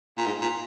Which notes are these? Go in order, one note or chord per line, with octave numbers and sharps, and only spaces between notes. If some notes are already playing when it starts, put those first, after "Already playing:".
A#2
G#2
A#2